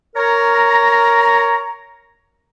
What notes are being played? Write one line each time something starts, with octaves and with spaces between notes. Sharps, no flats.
A#4 C#5 A#5